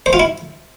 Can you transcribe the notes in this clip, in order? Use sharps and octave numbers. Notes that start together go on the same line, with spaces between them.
C5
F4
E4